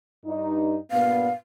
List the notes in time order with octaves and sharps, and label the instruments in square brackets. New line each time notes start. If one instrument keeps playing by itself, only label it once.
[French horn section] G2 D#4
[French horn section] G2 A#2 B3 [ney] F5